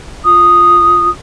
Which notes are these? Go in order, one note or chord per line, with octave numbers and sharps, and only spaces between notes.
F4 D#6